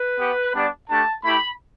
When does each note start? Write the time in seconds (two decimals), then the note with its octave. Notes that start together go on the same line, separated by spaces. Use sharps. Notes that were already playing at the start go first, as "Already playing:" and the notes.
Already playing: B4
0.19 B3 G4
0.55 G3 B3 D4
0.90 A3 D4 G4 A5
1.25 A3 E4 G4 B5